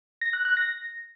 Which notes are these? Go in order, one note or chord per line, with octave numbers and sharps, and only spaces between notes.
A#6
F#6
F#6
A#6